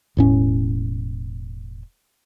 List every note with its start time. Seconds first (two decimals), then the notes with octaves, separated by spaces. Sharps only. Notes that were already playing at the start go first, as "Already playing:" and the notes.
0.17 E1 A2 C#4